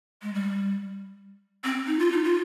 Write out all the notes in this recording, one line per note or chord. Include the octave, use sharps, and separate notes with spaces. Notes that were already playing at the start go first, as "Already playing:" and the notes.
G#3
G3
C4
D#4
F4
D#4
F4